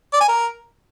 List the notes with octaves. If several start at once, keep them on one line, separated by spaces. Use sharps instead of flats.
D5
G#5
A#4